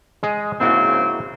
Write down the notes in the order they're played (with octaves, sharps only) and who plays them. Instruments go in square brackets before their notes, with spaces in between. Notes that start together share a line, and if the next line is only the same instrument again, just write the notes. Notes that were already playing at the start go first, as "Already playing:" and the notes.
[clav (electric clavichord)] G#3 G#4 D#5
[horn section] G#2 C#3 C4 [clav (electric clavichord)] A#3 E4 F#4